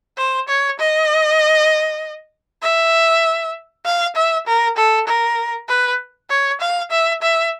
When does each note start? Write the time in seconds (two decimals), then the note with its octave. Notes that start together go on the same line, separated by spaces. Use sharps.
0.17 C5
0.48 C#5
0.79 D#5
2.62 E5
3.85 F5
4.16 E5
4.46 A#4
4.77 A4
5.07 A#4
5.69 B4
6.30 C#5
6.61 F5
6.91 E5
7.22 E5